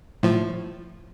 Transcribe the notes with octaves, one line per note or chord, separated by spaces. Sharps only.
A2 F3